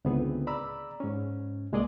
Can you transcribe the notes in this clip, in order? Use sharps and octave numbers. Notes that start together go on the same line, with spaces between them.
C#2 A2 D3 B3 C4 G#4
D5 A#5 B5 E6
G#2 C#4
C2 G#3 A#3 G#4 D5 D#5